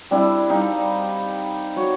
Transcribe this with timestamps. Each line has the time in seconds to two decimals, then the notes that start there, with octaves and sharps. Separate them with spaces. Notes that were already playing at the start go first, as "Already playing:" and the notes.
0.11 G3 C4 D4 E4
0.50 G3 D#4 F5
1.76 F#4 C#5 F#5